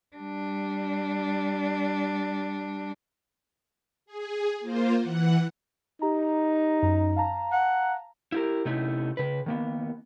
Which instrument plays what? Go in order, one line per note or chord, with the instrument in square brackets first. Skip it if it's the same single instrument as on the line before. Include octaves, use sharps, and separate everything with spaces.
[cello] G3 D4
[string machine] G#4
A#3 F4 C5
E3 F#5
[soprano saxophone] D#4 [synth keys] G4 A#5
[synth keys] F#2 A#5
F5 A5 A#5
[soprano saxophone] F#5
[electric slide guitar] E4 G4 A#4
C3 A3 C#4 D#4 E4
C#3 B4
D#3 A#3 B3